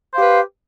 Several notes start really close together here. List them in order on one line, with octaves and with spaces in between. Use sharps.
C5 F5 G4 B4